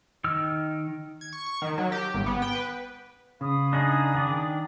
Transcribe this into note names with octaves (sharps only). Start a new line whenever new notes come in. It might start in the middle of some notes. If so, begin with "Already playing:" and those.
D#3 E6 F6
G#6
C#6
C#6
D#3
F#3
G4
G#1
B3
G5
B4
C#3 F5 B5 D#6
D4 D#4 G#4
D#3 D4 D5